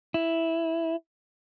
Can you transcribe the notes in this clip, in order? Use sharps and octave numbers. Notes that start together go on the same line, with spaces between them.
E4